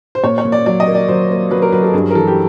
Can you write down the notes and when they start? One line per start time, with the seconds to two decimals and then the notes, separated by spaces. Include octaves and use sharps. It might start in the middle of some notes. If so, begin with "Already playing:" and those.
0.15 C5
0.24 A#2 C#5
0.38 C#5
0.45 A#2
0.52 D5
0.66 F#3 D5
0.80 D#5
0.88 A#3
0.95 D5
1.08 F#3 C5
1.30 A#3
1.51 F#3 B4
1.62 A#4
1.72 F#3 B4
1.83 A4
1.94 G2 G#4
2.10 A#4
2.15 E3 A4
2.27 G4